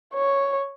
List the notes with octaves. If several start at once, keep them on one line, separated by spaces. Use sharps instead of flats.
C#5